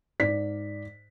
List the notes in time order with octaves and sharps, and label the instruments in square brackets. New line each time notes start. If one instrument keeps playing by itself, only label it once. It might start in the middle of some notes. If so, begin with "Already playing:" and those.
[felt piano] G#2 D5 B6